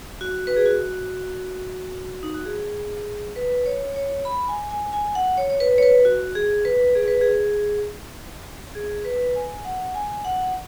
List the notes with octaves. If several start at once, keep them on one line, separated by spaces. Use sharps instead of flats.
F#4
B4
G#4
F#4
D#4
F#4
G#4
B4
C#5
C#5
B5
G#5
G#5
G#5
F#5
C#5
C#5
B4
C#5
B4
F#4
G#4
B4
G#4
B4
G#4
G#4
B4
G#5
F#5
G#5
F#5